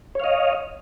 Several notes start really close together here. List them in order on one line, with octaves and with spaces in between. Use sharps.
C#5 F5 D#5